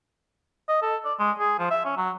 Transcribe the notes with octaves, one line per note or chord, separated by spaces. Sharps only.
D#5
A4
D5
G#3
G#4
F3
E5
C#4
F#3